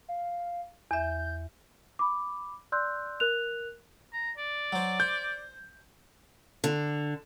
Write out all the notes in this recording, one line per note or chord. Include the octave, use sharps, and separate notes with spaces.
F5
E2 E5 G6
B5 D6
D5 C6 E6 F#6 G6
A#4 F#6 F7
A#5
D5
F#3 C5
C5 G6
D3